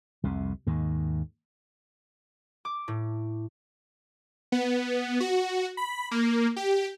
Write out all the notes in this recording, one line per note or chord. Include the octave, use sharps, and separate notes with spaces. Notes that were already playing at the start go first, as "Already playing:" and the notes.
C2 F2 C3
D#2 G#2 D#3
D6
A2
B3
F#4
B5
A#3
G4